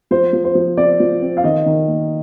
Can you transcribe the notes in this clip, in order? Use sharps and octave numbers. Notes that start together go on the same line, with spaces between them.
F3 C5
F3
C5
F3
C4 D5
F3
C4
F5
D#3 D#5
D#3
A#3